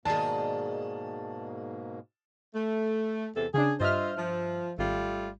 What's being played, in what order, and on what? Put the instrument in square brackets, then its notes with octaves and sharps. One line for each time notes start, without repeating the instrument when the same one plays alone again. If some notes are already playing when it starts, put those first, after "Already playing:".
[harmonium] G#2 B2 A#3 [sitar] D#3 G#4 [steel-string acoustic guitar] D5 D#5 [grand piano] A5
[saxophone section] A3
E2 C3 A4
[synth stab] C#3 D4 [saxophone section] G#4
[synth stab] G2 E5 F6 [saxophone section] F4 C5 D#5
[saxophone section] F3
[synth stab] G#1 [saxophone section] G3 A3 F4